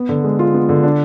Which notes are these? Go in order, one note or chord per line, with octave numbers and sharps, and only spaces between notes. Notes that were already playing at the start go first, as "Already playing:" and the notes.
Already playing: B3
D3
G#3
F4
B3
D3
D4